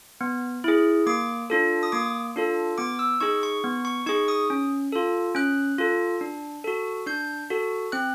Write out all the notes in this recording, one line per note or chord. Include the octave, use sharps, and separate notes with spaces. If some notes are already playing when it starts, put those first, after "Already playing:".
B3
E4 G#4
A#3 D6
D4 F4 A4
D#6
A#3 D6
D4 F4 A4
B3 D6
E6
D#4 G#4 C#6
C#6
B3
C#6
D#4 G#4 C#6
D#6
C#4
F4 A4
C#4 F#6
F4 A4
D4
F#4 A4
D4 G6
F#4 A4
C4 F#6